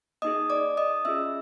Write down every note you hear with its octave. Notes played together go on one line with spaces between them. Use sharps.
A#3 D#4 G#4 D#5 D#6
D5 D6
D#5 D#6
C#4 F4 G#4 E5 E6